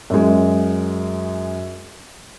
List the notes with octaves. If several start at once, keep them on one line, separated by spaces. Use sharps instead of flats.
F#2 G#3